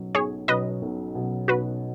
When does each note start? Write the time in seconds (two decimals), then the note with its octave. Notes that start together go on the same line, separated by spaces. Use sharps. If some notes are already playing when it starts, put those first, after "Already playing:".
Already playing: B1 B2 F#3 C#4
0.15 B1 G#4 C#5
0.48 B2 F#3 C#4 B4 D#5
0.82 B1
1.15 B2 F#3 C#4
1.48 B1 F#4 B4